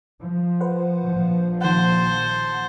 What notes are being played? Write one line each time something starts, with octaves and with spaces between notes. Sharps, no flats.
F3
B4 C5 F#5
A#1 F3
D#3 C5 F#5 A5